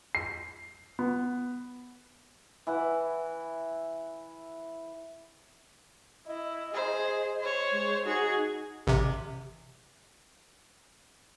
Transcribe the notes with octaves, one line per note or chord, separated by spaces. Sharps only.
C7
B3
E3 E4 F#5
E4 D#5
G#4 C5
C5 C#5
G#3
D#4 F#4 G#4
A1 C3